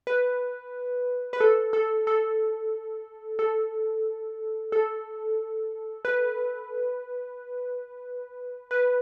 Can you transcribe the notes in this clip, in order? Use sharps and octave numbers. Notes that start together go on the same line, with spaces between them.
B4
B4
A4
A4
A4
A4
A4
B4
B4